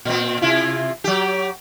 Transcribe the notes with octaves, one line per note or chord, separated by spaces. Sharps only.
A#2 C4
C3 E4 F4
F#3 G4